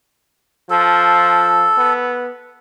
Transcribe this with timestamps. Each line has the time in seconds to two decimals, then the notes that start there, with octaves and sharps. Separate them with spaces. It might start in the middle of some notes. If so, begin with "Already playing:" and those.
0.70 F3 A4
1.78 B3